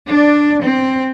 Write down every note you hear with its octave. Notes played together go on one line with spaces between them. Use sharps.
D4
C4